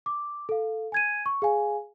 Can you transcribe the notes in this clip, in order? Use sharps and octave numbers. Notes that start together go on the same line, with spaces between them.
D6
A4 F5
G#5 G#6 D#7
C#6
G#4 F5 G#5